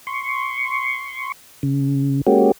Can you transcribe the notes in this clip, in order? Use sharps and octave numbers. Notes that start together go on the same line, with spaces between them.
C6 C#6
C#3
G#3 A#3 C#4 F#4 G4